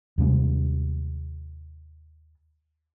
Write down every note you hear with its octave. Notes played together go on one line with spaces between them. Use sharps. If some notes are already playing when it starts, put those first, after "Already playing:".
D#2 C3 G3 G#3